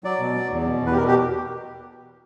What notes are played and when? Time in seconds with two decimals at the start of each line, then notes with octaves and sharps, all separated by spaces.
0.04 F#3 D5
0.19 B2
0.35 F#3
0.51 E2
0.66 B2
0.81 E2
0.87 B4
0.92 G4
0.97 B2 A#4
1.07 G4